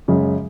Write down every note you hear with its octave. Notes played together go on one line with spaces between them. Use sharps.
F#2 C#3 G#3